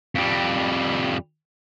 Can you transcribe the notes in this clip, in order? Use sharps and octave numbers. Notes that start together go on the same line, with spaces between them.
F2 G3